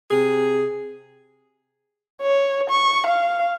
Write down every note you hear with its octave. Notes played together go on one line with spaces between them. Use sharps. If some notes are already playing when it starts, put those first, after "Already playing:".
C3 G#4
C#5
C#6
F5